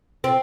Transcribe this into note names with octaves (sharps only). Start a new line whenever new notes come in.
C4